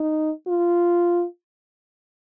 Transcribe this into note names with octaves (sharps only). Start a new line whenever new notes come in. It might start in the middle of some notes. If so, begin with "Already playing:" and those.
Already playing: D#4
F4